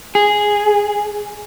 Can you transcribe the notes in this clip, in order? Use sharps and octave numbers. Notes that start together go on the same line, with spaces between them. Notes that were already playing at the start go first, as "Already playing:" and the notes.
G#4